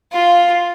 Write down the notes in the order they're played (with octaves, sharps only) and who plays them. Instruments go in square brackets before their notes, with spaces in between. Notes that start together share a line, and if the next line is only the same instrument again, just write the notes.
[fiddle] F4